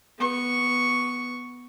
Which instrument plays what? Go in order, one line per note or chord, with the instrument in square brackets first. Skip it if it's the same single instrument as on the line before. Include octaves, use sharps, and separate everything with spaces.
[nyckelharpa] B3 C#6